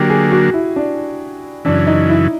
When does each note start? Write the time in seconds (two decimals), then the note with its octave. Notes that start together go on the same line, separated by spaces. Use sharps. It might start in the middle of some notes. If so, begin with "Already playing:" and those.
Already playing: D3 F#3 A#3 G4
0.09 G#4
0.32 F#4
0.54 E4
0.76 D4
1.65 F#2 C#3 E3 D4
1.87 D#4
2.09 E4